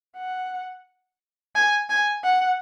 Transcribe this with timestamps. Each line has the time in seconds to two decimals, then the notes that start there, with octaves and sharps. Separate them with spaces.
0.17 F#5
1.55 G#5
1.90 G#5
2.24 F#5